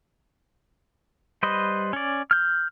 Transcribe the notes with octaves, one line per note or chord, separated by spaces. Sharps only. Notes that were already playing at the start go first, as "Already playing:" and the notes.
G3 B4 C5 D#5
C#4 D5
F6 G6